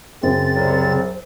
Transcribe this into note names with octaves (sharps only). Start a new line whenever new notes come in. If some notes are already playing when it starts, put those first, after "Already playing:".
F#2 C#3 C4 C5 A6
C2 F#3